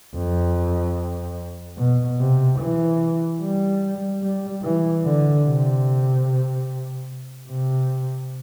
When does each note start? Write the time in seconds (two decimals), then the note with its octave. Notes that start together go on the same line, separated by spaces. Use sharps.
0.15 F2
1.78 B2
2.20 C3
2.59 E3
3.41 G3
4.22 G3
4.63 E3
5.05 D3
5.46 C3
7.49 C3